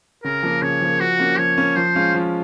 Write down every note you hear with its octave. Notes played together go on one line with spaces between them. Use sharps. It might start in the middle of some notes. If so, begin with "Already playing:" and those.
C#3 A#4
F3 A#3
C#3 C#5
F3 A#3
F3 F#4
A#3 C#4
F3 C#5
A#3 C#4
F3 C5
G#3 C#4 F4
F3